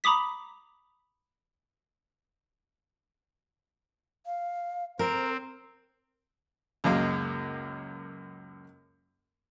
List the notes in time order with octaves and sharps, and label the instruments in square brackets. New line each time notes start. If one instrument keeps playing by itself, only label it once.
[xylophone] A#5 B5 D6 D#6 B6
[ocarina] F5
[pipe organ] C4 [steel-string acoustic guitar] A#4 [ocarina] C5
[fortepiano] C#2 F#2 G#3 A#3